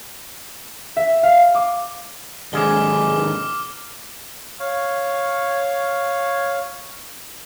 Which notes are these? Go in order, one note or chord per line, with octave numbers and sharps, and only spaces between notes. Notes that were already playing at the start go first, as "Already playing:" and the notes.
E5
F5
D6
D#2 G#2 D3 G#3 G#4 D6 F6 G7
C#5 F5